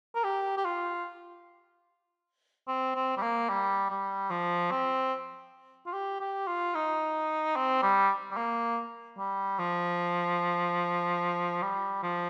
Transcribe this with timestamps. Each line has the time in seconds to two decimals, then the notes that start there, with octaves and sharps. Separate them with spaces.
0.15 A#4
0.24 G4
0.57 G4
0.65 F4
2.67 C4
2.95 C4
3.17 G3
3.22 A#3
3.49 G3
3.90 G3
4.30 F3
4.71 C4
5.86 F4
5.93 G4
6.20 G4
6.47 F4
6.74 D#4
7.56 C4
7.82 G3
8.31 G3
8.37 A#3
9.18 G3
9.59 F3
11.62 G3
12.03 F3